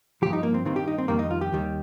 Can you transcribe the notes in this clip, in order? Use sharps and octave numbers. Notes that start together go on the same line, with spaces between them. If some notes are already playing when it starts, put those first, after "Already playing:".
G2 F3 G4
D#4
A#3
C4
G2 D#3 G3 C4
G4
D#4
C4
F2 D#3 G3 A#3
D#4
F4
G4
D#2 D#3 G3